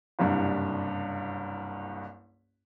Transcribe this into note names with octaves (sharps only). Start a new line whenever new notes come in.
F#1 C2 G2